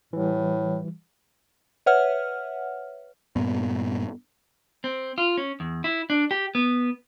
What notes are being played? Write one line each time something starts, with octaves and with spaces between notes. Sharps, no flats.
A2 E3 G3
B4 C#5 E5 F#5 F6
G2 A#2 B3
C4
F4
C#4
E2
E4
D4
G4
B3